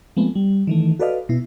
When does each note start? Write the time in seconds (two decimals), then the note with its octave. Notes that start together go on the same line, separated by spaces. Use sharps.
0.17 F3 G#3 A3 B3 C4
0.36 G3
0.67 D#3 E3 A3
0.99 F#4 A4 B4 D5 D#5 F5
1.29 B2 E4